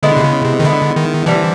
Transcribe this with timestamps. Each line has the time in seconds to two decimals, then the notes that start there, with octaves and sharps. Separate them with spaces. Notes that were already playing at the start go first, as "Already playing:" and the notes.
0.03 D3 G#3 B3 E4
0.17 C3
0.24 C#3
0.45 C3
0.60 D#3
0.64 D3 G#3 B3 E4
0.96 D#3
1.26 D3 E3 G3 C4